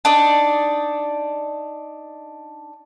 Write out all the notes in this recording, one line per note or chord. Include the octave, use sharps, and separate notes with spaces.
D4 D#4 D5